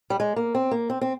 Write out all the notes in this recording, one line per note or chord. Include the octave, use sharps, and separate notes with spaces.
G3
G#3
A#3
C4
A#3
C4
C4